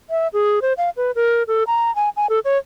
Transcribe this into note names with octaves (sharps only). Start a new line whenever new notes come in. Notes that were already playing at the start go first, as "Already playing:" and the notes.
E5
G#4
C5
F5
B4
A#4
A4
A#5
G#5
G#5
A4
C#5